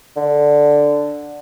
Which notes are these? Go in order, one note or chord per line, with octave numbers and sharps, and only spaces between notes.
D3